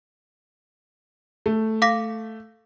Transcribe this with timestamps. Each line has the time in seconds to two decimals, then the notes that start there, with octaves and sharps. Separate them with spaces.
1.46 A3
1.82 F5 D6 A#6